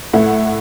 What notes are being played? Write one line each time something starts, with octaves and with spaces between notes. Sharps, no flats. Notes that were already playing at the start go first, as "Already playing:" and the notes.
A2 A3 E4 F#5